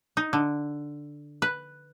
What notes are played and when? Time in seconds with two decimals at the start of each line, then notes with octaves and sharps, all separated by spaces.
0.17 D#4
0.33 D3
1.42 B4